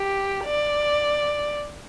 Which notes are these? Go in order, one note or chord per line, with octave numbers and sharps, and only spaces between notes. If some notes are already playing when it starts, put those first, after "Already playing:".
Already playing: G4
D5